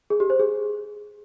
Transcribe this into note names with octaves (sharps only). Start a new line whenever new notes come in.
G#4
G4
C5
G#4